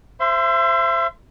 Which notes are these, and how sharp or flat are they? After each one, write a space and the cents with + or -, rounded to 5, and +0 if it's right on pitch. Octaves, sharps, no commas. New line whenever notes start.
C5 +10 E5 +35 C6 -25